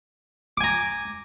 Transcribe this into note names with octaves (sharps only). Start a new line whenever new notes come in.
G#5 A#5 D6